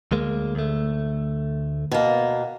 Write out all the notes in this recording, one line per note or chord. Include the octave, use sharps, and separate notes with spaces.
D2 G#3 A#3
D2 A3
B2 A#3